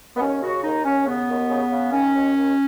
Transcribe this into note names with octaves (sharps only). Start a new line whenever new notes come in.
B3
D#2 C#4
C#3 F#4
D#2 D#4
D#2 C#4
C#3 B3
D#2
C#3
C#3
D#3 C#4
D#2
D#2